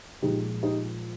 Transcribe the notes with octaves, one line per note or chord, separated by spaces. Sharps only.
A#2 F3 G#3 D#4 G4
D#4 G4